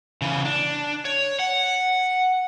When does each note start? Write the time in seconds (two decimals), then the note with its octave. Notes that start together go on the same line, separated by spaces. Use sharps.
0.22 C#3 E3
0.45 D4
1.05 C#5
1.39 F#5